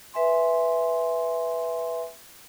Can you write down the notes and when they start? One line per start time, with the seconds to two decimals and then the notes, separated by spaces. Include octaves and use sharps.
0.14 B4 E5 G#5 C6